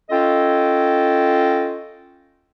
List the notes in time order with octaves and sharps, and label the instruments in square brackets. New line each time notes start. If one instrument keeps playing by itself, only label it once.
[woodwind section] C#4 F4 A4 D#5 G5